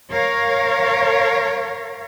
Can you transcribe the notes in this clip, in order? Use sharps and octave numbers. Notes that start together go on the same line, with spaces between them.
A#4 C#5 F5